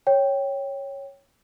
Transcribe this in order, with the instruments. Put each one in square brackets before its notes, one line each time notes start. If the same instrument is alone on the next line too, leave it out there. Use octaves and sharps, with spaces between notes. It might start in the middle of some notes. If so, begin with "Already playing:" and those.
[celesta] C#5 G5